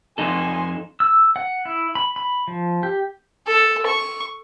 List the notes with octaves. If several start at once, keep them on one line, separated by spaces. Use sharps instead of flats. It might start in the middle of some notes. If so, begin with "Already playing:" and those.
F2 D#4 A4 G#5 C6
E6
F#5
E4
B5
B5
F3
G4
A4
C#6